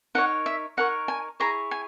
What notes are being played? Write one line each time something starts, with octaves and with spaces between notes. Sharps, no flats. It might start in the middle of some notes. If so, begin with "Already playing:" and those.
D#4 A#4 C#5 F#5
E5
D#4 A#4 C#5 F#5
G#5
E4 G#4 C#5 A#5
G#5